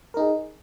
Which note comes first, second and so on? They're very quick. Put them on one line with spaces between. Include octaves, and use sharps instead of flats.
A#4 D#4 G#4